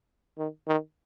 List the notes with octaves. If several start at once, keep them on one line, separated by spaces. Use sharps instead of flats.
D#3
D#3